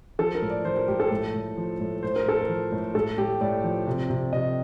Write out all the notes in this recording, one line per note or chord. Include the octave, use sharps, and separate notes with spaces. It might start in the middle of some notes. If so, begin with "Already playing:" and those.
F3 A4
A#4
A2
D5
F3 C5
A#4
A2 G4
A4
A2
A2
F3
A2
A2 C5
A#4
A2 A4
A#4
F3
A2
A2 A4
A2 G4
A2 D5
F3
C3
C3
C3 D#5